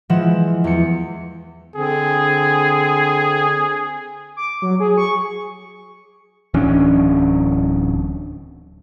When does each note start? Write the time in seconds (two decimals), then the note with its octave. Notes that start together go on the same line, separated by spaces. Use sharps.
0.09 E3 F3 G#3 E4 F#5 E7
0.64 E2 C#7
1.76 D3 C4 G#4
4.37 D6
4.62 F#3
4.80 G#4
4.98 C#6
6.54 D1 E3 C#4 D4